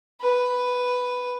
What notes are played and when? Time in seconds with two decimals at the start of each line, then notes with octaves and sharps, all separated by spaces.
0.21 B4